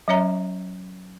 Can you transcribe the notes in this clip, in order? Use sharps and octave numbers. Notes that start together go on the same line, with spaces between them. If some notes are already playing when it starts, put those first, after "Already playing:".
F#3 C#4 C#5 E5 A#5